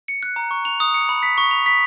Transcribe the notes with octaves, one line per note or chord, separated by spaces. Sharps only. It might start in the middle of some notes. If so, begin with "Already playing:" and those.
C#7
F#6
A#5
C#6
F7
D#6
C#7
B5
B6
C#6
F7
B6